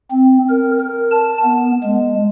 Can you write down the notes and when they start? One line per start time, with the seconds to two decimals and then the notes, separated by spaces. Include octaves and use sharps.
0.11 C4
0.50 A#4
0.80 A#4
1.11 A5
1.43 B3
1.83 G#3